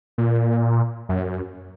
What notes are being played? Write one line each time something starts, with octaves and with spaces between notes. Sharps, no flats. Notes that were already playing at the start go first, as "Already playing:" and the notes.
A#2
F#2